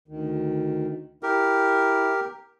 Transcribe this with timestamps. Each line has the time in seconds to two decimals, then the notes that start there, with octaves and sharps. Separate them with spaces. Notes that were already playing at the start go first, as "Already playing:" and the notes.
0.08 D2 D#3
1.23 E4 G4 A#4